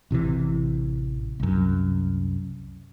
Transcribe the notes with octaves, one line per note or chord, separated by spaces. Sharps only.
A1 C3 D#3 E3
C2 F#2